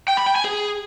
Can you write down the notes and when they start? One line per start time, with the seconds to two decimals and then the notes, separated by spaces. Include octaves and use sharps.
0.08 G5
0.17 B5
0.26 G5
0.35 G#5
0.45 G#4